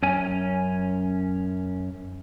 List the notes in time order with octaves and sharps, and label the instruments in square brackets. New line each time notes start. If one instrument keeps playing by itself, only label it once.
[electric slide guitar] F#2 C#4 G#5